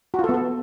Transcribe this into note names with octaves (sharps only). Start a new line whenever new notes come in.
F#4
F4
A4
B3
A4